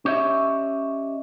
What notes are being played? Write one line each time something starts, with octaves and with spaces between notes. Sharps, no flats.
C#4 G4 C#5 D#5 E5